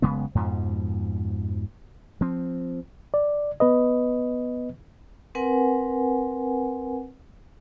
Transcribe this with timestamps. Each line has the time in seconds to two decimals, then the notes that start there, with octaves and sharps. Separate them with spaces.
0.02 F#1 C#3 G#3 B3
0.35 F2 G#2 B2 F3
2.21 F3 C4
3.14 D5
3.60 B3 B4 D#5
5.35 C4 A#4 B4 F#5 G#5